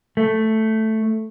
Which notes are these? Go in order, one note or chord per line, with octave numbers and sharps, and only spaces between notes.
A3